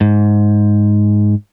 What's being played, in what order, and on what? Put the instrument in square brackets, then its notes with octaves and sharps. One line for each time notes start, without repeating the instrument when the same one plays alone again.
[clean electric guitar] G#2